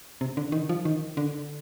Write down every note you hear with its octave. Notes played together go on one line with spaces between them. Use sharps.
C3
D3
D#3
F3
D#3
D3